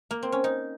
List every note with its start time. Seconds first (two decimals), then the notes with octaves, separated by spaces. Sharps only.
0.11 A#3
0.23 C4
0.32 C#4
0.44 D#4